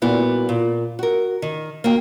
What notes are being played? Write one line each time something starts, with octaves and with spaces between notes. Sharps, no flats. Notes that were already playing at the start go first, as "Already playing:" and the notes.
A#2 G3 B3 E4 F#4
A#2
F#4 A#4
D#3
A#3 F#4 G5